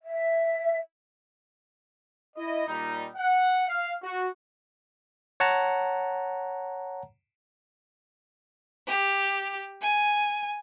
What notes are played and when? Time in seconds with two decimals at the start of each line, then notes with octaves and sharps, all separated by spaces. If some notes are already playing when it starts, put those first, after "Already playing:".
0.04 E5
2.36 E4 D#5
2.67 A#2 G3 D#4
3.16 F#5
3.68 F5
4.02 F#4
5.40 C#5 F#5 A5 A#5
8.87 G4
9.82 G#5